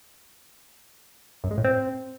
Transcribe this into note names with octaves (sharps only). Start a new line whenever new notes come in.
F#2
G#3
A2
C4